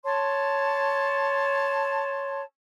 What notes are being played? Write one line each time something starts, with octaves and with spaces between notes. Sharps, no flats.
C#5 A5 C6